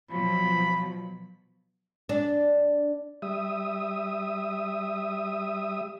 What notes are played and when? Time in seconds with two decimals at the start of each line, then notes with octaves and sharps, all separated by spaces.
0.11 B2 F3 F#3 B5
2.09 D4
3.22 G3 E5 D#6